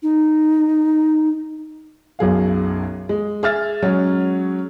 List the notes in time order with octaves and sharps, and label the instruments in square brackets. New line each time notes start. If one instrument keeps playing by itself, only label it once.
[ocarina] D#4
[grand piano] B1 F#2 G#4 F5
G#3
G#4 E5 F6 A6
F#3 G#3 C#4